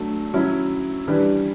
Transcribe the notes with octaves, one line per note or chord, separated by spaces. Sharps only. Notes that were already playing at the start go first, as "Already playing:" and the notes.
Already playing: F#3 A3 D4
F#3 C#4 E4
E3 G3 D4